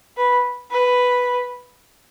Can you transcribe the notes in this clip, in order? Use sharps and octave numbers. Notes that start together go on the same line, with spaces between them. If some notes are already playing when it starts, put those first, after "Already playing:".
B4
B4